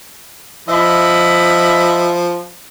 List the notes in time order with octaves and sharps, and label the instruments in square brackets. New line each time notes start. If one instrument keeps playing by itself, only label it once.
[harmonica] F3 [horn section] D#5 E5 B5